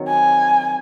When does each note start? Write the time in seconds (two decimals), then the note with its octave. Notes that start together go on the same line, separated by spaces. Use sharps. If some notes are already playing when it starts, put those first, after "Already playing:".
Already playing: D#3 F#3 C4
0.08 G#5